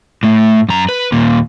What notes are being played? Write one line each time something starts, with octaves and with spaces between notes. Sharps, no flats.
A2 A3
F#2 A#5
B4
D#2 A#2